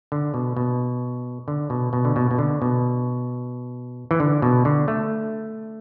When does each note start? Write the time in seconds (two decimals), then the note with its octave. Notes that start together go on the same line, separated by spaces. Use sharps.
0.12 D3
0.34 B2
0.57 B2
1.48 D3
1.70 B2
1.93 B2
2.05 D3
2.16 B2
2.31 B2
2.38 D3
2.62 B2
4.11 E3
4.20 D3
4.42 B2
4.65 D3
4.88 A3